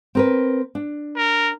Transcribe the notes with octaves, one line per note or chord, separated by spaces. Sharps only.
C4 A#4 B4
D4
A#4